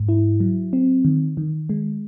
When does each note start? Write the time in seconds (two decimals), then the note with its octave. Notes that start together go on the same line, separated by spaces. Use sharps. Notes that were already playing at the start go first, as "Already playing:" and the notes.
Already playing: G#2
0.09 E4
0.40 F#3
0.73 C4
1.05 D#3
1.37 D#3
1.69 G#3